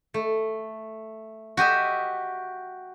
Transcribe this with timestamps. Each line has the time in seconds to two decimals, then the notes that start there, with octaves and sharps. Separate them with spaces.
0.14 A3
1.57 F#4 G4 D#5 E5